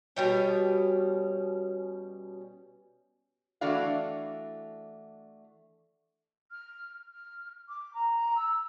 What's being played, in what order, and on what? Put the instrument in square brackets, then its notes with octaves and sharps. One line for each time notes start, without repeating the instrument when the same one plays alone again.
[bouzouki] B2 G3 C#4
[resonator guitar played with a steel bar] E3 A3 D4 F#4 D5 F5
[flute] F6
F6
D6
A#5
E6